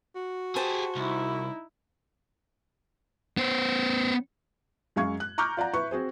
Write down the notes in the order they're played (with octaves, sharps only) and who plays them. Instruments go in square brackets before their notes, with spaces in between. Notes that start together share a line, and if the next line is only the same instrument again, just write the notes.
[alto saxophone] F#4
[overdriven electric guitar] G4 G#4 [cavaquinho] C5 A5
[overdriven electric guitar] C2 [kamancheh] D#4 E4
[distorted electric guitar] B3 C5
[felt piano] F#2 G#3 F5 C#6 G#6
F#6
A#5 C#6 D6 F6 G6
F4 D5 F#5 A#5
E4 B4 C#6
C4 F#4 G#4 C5